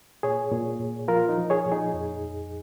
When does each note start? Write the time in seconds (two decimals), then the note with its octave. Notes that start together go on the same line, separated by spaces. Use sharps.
0.23 A#2 G#4 C#5
0.52 A#2
0.80 A#2
1.08 F3 F4 A#4
1.29 D#4
1.37 F3
1.50 G#4 C#5
1.65 A#2
1.72 D#4 G#4
1.94 F2
2.21 F2